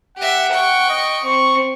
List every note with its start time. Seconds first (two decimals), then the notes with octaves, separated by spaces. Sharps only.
0.17 G4 E5 F#5
0.53 G5 C#6
0.89 D#5
1.25 C4 C#6